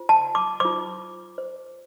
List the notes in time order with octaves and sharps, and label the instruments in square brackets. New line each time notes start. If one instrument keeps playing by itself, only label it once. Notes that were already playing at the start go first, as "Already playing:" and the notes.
Already playing: [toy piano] F4 C5
A5
D6
F4 C5 D6
C5